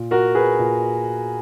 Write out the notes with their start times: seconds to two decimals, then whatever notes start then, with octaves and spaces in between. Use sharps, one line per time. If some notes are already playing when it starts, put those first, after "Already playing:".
Already playing: A#2
0.11 F#4 A#4
0.35 G#4 B4
0.59 A#2